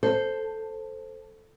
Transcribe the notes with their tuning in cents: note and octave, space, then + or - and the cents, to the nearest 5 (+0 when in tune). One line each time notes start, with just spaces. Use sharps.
A4 +0 C5 +0